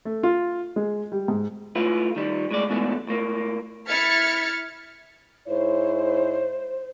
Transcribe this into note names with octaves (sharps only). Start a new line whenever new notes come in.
A3
F4
G#3
G3
G#2
A3 E4 F4 B4
D#3 G3
A2 G#3 D5
G#2 B2 E3 A3 D4
A2 A#3
E4 F6 G#6 A6 B6 C#7
G#2 E4 C5 C#5